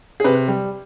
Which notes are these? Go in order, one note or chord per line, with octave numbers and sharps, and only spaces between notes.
G#4
C3 B4
G3